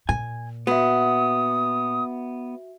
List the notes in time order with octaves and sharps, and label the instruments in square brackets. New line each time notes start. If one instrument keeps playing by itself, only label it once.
[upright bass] A#2 [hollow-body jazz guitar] G#5
[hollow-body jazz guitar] B3 [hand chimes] F#4 E5 [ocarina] D#6